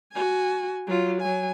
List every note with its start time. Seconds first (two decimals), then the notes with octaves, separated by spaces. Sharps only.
0.13 F#4 G#5
0.87 F#3 F4
1.21 F#3 G#5